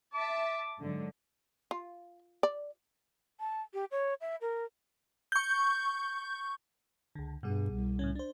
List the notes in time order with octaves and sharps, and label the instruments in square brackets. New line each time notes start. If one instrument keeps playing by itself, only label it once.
[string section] E5 A5 [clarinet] D6
[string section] G#2 D3 F#3
[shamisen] F4
D5
[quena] A5
G4
C#5
E5
A#4
[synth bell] C#6 G6
[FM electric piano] C#2 D3
[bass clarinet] G2 [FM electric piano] B2 G3 G#4
[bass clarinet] C2
[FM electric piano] A2 C#3 C#4
D4 C5